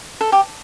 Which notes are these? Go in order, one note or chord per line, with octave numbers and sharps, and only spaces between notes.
A4
G4